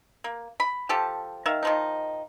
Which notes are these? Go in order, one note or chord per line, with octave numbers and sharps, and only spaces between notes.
A#3
B5
F3 G4 A4 A5
D#3 A#4 E5 F5
D#3 F3 D#4